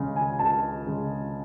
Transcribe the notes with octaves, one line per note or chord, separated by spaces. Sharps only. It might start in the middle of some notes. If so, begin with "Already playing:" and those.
Already playing: C#2 C#3 G#3
G#5
C#2 A5
C#3 G#3